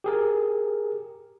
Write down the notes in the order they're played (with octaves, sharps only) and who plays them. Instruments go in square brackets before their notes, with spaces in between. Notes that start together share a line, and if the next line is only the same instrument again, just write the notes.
[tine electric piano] G4 G#4 A#4